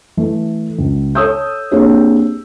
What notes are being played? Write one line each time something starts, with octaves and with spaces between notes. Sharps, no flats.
E3 A3
C#2
A4 C#5 D#6 E6 G6
A#3 C4 D4 G4 G#4 C#5